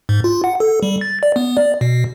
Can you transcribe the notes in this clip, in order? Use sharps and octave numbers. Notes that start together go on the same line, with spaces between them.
G#2
F4
F#5
A4
G3
A6
D5
B3
D5
B2